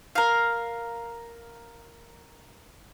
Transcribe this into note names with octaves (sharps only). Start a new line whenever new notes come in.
A#4 F5